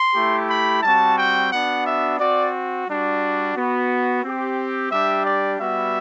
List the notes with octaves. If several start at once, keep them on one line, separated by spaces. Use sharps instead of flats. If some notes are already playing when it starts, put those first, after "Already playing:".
Already playing: C6
A3 E4 G4
B5
G3 C4 F#4 A5
G5
B3 D4 F#4 F#5
E5
C4 F#4 D5
G3 D4 F#4
B3 F#4
C4 G4
G3 D4 G4 E5
D5
G3 B3 F#4 E5